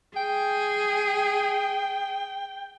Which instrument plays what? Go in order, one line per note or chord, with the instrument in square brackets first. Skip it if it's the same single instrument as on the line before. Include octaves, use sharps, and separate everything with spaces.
[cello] G#4 [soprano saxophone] G5